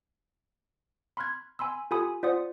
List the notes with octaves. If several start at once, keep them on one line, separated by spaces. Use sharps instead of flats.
B5 C6 F6 F#6 G#6
G#5 B5 C6 E6
F4 G4 A4 G#5 B5 D#6
F4 C5 D5 F#5 D#6